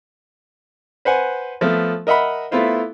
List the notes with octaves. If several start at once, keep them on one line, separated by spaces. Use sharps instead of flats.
B4 C5 F#5 G#5
F3 A3 B3
A#4 D#5 E5 F#5 B5
A3 B3 E4 F4 C5